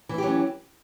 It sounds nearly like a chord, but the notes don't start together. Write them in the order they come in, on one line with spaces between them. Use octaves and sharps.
E3 E4 G4 F#3 C#4